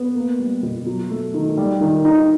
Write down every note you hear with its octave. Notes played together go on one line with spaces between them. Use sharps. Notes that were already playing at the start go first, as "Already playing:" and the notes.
Already playing: B3
A#3
G3
B2
F#3
A3
D#3
G3
D#3
D#4